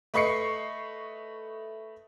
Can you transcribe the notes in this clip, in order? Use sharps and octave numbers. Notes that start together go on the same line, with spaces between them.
A3 B4 D#5 C#6 C7 C#7